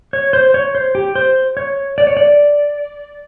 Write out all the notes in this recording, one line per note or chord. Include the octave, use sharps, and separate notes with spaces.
C#5
C5
C#5
C5
G4
C5
C#5
D5
C#5
D5